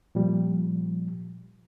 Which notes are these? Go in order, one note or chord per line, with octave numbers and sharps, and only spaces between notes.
A#2 F3 G3